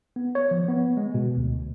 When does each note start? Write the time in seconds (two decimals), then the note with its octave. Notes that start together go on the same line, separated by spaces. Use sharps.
0.16 B3
0.35 C#5
0.51 F3
0.68 B3
0.97 G#3
1.14 B2
1.37 D2